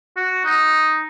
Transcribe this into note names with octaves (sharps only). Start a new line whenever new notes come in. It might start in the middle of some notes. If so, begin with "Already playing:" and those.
F#4
D#4